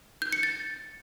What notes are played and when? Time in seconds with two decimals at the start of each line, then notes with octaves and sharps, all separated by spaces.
0.22 G6
0.32 C#7
0.43 A6